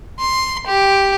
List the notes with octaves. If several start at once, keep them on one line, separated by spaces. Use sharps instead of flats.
C6
G4